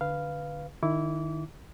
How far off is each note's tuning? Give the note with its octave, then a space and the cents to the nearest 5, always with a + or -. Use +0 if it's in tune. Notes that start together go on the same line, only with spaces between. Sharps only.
D3 +0 B4 +0 F5 -5
D#3 -20 E4 +0 D6 -30